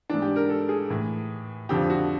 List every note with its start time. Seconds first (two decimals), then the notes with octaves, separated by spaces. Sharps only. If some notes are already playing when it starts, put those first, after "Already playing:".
0.10 G#2 E3 D4
0.22 G4
0.36 A#4
0.49 A4
0.69 G#4
0.90 A2 E3
1.69 F2 D3 F3 G4
1.90 F#4